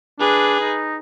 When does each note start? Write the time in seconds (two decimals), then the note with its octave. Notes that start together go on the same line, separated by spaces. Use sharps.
0.20 D4 G#4 B4
0.60 D#4